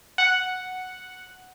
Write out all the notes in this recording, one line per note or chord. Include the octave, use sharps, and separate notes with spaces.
F#5